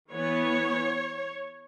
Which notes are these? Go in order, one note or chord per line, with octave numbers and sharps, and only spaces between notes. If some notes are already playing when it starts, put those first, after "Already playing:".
E3 B3 C#5